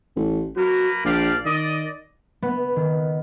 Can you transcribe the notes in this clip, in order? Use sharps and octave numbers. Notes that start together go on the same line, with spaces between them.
A1
F#3 A#3 A#4 B4
A#1 G4 D5 F5
D#3 D5 D#5
B3
D#3